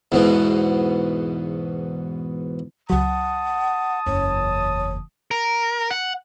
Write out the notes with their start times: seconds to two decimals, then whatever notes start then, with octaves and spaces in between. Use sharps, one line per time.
0.12 E2 G#2 B2
2.90 C#2 F#3 F#5 A5 D#6
4.06 F#1 E2 C#5
5.31 A#4
5.91 F#5